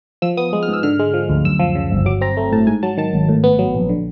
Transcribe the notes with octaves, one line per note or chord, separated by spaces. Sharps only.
F3 E6
B3 D#6
G#3
F6
G#2
E6
D3 F6
G#3
F3
D2
F#2 E6
F3
C#3
G1
F#3 D6
C4 A#5
A3
A2 A5
G#2 G#5
F#3 A5
D#3 A5
G#1
A2
B3
F#3
A#1
D3